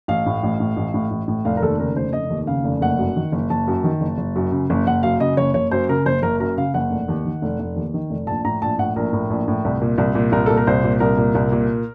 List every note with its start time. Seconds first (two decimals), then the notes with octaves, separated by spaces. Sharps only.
0.08 A1 F5
0.26 A2
0.43 A1
0.60 A2
0.77 A1
0.94 A2
1.11 A1
1.28 A2
1.45 F1 F5
1.57 A#4
1.62 D#2 A4
1.80 C#3 A#4
1.96 F1 C5
2.13 F1 D#5
2.30 D#2
2.47 C#3 F5
2.64 F1
2.82 F#1 F#5
2.99 F#2
3.16 D#3
3.32 F#1
3.50 F#1 A5
3.68 F#2
3.84 D#3
4.01 F#1
4.18 F#1
4.36 F#2
4.52 C#3
4.70 F#1
4.86 F#1 F#5
5.03 F#2 F5
5.20 C#3 D#5
5.37 F#1 C#5
5.54 F#1 C#5
5.71 F#2 C5
5.89 C#3 A#4
6.05 F#1 C5
6.22 F#1 A#4
6.40 F#2 A#4
6.57 C#3 F5
6.74 F#1 F#5
6.91 F1
7.08 D#2
7.25 D#3
7.42 F1
7.59 F1
7.76 D#2
7.94 D#3
8.10 F1
8.27 A#1 A5
8.45 A2 A#5
8.62 A#1 A5
8.79 A2 F#5
8.96 A#1 A#4
9.13 A2
9.30 A#1
9.48 A2
9.65 C2
9.81 A#2
9.98 C2
10.15 A#2
10.32 C2 A#4
10.46 A#2 A4
10.57 A#4
10.67 C2 C5
10.84 A#2
11.00 C2 A#4
11.17 A#2
11.35 C2
11.52 A#2